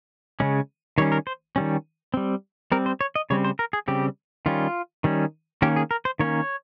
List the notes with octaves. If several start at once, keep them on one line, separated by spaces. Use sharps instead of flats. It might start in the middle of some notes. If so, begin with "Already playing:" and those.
C#3 G#3 C#4
D#3 G3 C#4 C#5
A#4
C5
D#3 G3 C#4
G3 C4
G3 C4 A#4
C5
C#5
D#5
C#3 G3 C4 C#5
C5
A#4
G#4
C#3 G3 C4 G4
D#3 G3 C#4 F4
D#3 G3 C#4
D#3 A#3 C#4 G4
G#4
A#4
C5
D#3 A#3 C#4 C#5